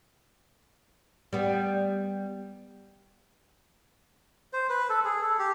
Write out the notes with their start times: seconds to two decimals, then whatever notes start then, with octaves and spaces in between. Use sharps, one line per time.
1.33 G3 B3
4.53 C5
4.69 B4
4.90 A4
5.04 G#4
5.22 A4
5.39 G4